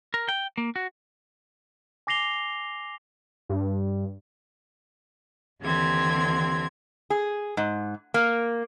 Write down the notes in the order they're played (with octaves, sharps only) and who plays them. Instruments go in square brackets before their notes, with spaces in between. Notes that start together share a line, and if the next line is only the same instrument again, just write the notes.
[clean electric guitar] A#4
G5
A#3
F#4
[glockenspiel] G#5 D6 A#6 C7 F7 G7
[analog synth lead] G2
[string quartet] D#2 D3 E3 C4 G4 G#6
[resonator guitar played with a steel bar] G#4
G#2
A#3